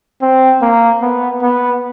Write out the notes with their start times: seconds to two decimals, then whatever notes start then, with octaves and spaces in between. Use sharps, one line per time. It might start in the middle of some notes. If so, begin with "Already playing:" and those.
0.21 C4
0.61 A#3
1.02 B3
1.42 B3